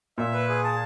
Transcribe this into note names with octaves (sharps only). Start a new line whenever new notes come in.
A#2 E5
B4
G#4
A5